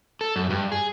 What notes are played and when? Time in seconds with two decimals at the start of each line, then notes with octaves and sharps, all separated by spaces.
0.21 A4
0.36 F#2
0.50 G2
0.72 G#4